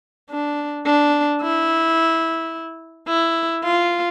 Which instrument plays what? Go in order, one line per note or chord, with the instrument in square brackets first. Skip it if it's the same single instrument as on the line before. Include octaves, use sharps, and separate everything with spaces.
[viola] D4
D4
E4
E4
F4